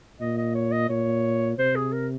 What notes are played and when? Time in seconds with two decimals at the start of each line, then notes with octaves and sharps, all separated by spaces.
0.21 A#2 D#5
0.38 D#5
0.55 C#5
0.72 D#5
0.89 A#2 C#5
1.58 C3 C5
1.76 G#4
1.93 A#4